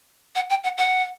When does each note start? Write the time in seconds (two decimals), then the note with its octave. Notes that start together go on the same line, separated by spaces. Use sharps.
0.36 F#5
0.50 G5
0.64 F#5
0.78 F#5